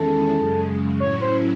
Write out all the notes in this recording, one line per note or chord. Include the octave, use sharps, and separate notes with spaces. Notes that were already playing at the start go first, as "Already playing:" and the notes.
Already playing: E2 D#3 G#3 C#4 E4 A4
F#2 C#3 G#3
A2 F#3 C#4 E4 C#5
C5